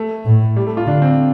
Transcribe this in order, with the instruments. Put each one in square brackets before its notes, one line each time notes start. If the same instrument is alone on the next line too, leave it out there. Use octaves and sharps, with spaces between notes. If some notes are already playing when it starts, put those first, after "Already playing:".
Already playing: [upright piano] A3
[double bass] A2
[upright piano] G3
A3
F4
[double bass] D3 [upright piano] D4
[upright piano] C4